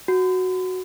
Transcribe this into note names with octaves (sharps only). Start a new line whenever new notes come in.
F#4